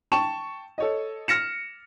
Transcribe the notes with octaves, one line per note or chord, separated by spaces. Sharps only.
G5 A5 C#6 E7
A4 C#5 D#5
F6 A#6 C#7 E7